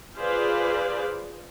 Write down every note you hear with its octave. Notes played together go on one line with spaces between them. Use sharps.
F4 G#4 B4 C5 D5 F5